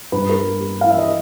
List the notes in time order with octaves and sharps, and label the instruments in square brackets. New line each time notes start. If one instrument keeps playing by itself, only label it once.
[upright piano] G2 B4
A#4
G3
G3
E3 F5
E5
D#5